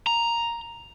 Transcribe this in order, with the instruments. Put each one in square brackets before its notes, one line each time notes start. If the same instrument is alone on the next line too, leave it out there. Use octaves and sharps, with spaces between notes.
[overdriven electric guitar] A#5